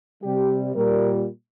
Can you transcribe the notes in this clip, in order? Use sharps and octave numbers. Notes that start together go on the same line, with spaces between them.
C3 G3 G4
A#2 G3 A#4